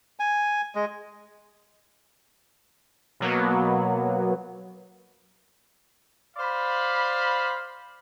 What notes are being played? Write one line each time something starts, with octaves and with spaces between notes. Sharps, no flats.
G#5
G#3
B2 F#3 A#3 B3
C5 D5 F5 B5